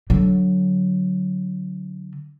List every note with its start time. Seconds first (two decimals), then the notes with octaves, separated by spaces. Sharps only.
0.10 D3 F#3